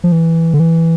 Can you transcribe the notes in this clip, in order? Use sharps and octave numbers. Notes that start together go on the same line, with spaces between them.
F3
E3
D3
E3